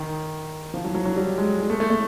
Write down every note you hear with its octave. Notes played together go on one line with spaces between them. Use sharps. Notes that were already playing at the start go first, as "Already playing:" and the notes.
Already playing: D#3
F3
F#3
F#3
F#3
G3
G#3
G#3
A3
A3
A3